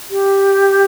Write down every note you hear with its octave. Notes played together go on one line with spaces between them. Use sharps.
G4